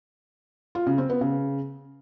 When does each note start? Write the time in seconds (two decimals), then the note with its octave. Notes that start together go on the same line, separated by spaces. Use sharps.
0.75 F4
0.87 C#3
0.98 C4
1.10 B3
1.21 C#3